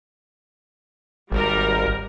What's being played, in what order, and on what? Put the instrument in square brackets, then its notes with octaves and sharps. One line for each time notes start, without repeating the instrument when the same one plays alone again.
[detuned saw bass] G#1 [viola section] G3 A#4